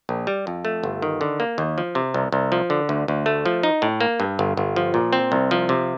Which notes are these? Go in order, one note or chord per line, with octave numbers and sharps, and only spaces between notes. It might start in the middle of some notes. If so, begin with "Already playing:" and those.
A#1
G3
F2
A3
G1
D#3
D3
A#3
D#2
F3
C3
C2
C2
F3
D3
D2
D2
A3
F3
D#4
A2
A#3
G2
G1
G1
F3
A#2
C4
C2
F3
C3